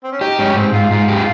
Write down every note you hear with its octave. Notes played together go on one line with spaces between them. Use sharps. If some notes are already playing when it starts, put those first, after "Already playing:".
C4
C#4
D#4 G4
G#2 C#4
G#2 C4
G#2 F4
G#2 F4
G4
F4